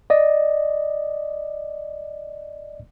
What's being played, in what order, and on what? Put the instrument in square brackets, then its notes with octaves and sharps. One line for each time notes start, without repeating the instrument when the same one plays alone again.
[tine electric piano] D5 D#5